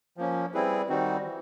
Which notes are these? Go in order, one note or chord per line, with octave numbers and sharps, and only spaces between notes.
F3 A#3 C#4
G3 C4 E4 G#4 B4
D#3 G3 C4 D#4 F#4
E3